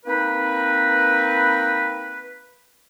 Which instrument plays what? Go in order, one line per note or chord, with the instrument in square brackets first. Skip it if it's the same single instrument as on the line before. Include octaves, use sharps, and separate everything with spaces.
[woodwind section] A#3 C4 D#4 B4